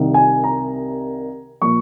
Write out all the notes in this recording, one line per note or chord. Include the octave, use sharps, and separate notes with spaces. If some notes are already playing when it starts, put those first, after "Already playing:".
Already playing: C2 C3 D#3
G#5
A#5
A#2 F3 A#3 C#6